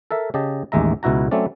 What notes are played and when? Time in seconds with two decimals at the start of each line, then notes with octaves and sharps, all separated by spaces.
0.11 A4 A#4 E5
0.34 C#3 G4 D#5 A5
0.72 A1 D#2 G#3 E5 A#5
1.03 C#2 B2 E4 F#4 A#5
1.31 F#3 A3 C4 C#4 D5